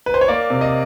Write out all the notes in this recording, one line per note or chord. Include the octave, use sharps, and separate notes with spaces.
B4
C5
C#5
A#3 D5
C3
D#5